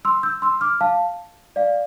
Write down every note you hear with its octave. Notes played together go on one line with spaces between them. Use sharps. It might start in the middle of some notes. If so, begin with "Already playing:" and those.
C6 E6
E6 G6
C6 E6
D6 F6
F5 A5
D5 F5